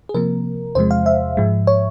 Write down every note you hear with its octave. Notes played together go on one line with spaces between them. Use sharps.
G#4
C3 F3 A#3 A#4
E2 C3 F3 G#3 C5
F5
E5
G#2 F3 G#3
C#5